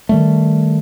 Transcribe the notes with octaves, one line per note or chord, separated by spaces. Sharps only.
D#3 G3 A3